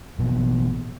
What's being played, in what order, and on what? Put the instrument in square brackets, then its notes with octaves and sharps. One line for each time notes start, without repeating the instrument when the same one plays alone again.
[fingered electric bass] A1 B2